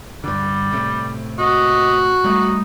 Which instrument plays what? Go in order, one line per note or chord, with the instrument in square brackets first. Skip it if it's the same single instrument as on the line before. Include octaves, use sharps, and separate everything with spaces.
[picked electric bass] G2 D3 [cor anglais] G3
[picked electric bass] A2 C3
[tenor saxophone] F#4 [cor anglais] D#5
[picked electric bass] G3 A3 [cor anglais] D#4